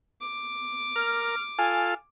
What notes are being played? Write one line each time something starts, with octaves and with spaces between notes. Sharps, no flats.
D6
A#4 F6
F4 A4 F5 G#5